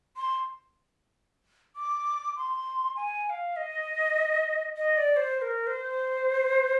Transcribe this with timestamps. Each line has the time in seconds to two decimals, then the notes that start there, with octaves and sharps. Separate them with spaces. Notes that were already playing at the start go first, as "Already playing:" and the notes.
0.17 C6
1.76 D6
2.36 C6
2.96 G#5
3.26 G#5
3.30 F5
3.56 D#5
4.77 D#5
4.97 D5
5.16 C5
5.37 C5
5.42 A#4
5.67 C5